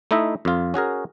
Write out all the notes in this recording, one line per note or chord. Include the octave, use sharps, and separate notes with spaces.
A3 D#4 E4 D#5 E5
F2 F4
C#4 F#4 G#4 A#4